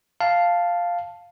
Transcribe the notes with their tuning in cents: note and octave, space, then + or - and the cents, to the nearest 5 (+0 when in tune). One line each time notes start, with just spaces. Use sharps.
F5 +0 A5 +0